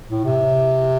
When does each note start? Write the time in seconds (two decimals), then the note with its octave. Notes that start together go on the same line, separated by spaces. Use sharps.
0.10 A2
0.25 C3